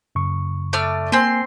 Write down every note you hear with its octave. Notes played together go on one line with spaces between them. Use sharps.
F#2 C#3 C#6
A3 D5 F6
A#3 C4 G#5 C6